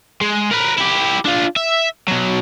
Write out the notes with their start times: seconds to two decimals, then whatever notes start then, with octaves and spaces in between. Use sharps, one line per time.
0.21 G#3
0.51 A#4 B4
0.77 E4 G4
1.25 D4 F4
1.56 E5
2.08 B2 F#3